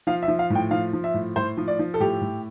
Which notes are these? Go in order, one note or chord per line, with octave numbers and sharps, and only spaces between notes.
F3 F5
E5
F3
F5
A2
G5
F3 F5
F3
E5
A2
A2 C5
F3
D5
F3
A4
A2 G4
A2